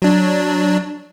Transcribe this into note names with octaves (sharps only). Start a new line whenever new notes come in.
F#3 D4